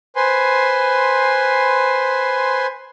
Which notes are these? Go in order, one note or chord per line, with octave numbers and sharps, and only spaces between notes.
B4 C5 G#5 C6